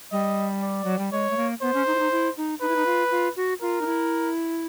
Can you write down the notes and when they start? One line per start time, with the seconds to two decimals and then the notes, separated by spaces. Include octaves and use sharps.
0.12 G3 D#5
0.62 D5
0.84 F#3
0.99 G3
1.12 G#3 C#5
1.31 A3
1.37 A#3
1.62 B3 C5
1.74 C#4
1.87 D#4
1.95 E4
1.99 D#4
2.12 E4
2.37 D#4
2.61 D#4 B4
2.69 E4
2.76 D#4
2.86 F4
3.11 F4
3.36 F#4
3.61 F4 A#4
3.81 D#4
3.86 E4